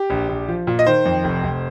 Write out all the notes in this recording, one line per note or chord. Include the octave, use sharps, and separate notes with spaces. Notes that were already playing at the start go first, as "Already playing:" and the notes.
Already playing: G4
A#1
A#1
F3
A#2
D#5
D#3 C5
F2
F1
F1